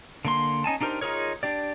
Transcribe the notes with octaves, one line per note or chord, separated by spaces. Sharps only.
D3 A#3 C6
C#4 D#4 G#5 A5
D4 D#4 G4 A#4 C5
D#4 F4 G#4 A#4 C#5
D4 G4 D5